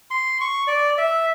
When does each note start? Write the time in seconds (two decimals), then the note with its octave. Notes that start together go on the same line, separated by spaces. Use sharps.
0.11 C6
0.41 C#6
0.67 D5
0.98 E5